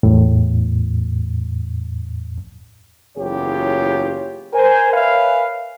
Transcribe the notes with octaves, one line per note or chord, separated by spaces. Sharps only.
E2 A2
F#1 E2 F4 G4 C#5
A#4 C5 G#5
A#4 B4 C#5 E5 F5 G#5